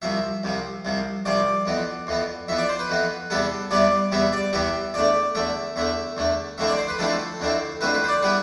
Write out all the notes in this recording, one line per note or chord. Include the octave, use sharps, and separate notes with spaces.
C2 C3 F3 E5
C2 C3 F3
C2 C3 F3
C2 C3 F3 D5
F2 E3 B3
F2 E3 B3
F2 E3 B3 E5
D5
C5
B4
F2 E3 B3
E2 C3 E3 G3 B3 A4
E2 C3 E3 G3 B3 D5
E2 C3 E3 G3 B3 E5
D5
E2 C3 E3 G3 B3 E5
E2 D3 A3 D5
E2 D3 A3 E5
E2 D3 A3 E5
E2 D3 A3
F2 D3 A3 C4 E4 E5
D5
C5
B4
F2 D3 A3 C4 E4 A4
F2 D3 A3 C4 E4
F2 D3 A3 C4 E4 B4
B4
C5
D5
D3 G3 B3 E4 B4